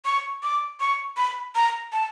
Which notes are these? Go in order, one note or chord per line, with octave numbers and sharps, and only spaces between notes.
C#6
D6
C#6
B5
A#5
A5